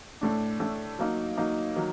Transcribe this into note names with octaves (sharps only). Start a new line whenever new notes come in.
A2 A3 D4
A2 A3 D4
F#3 A#3 D#4
F#3 A#3 D#4
D#3 F#3